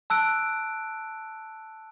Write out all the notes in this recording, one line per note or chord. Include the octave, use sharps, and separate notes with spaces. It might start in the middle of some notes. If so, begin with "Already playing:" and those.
A5 E6 F#6 D7